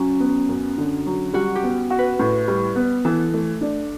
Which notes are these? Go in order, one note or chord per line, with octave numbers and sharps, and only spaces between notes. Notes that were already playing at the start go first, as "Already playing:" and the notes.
Already playing: F#3 C#4
B3
F#2
D3
F#3
G3 F#4
G4
B3
F#4
B4
A2
G3
B3
E3 A4
A3
D4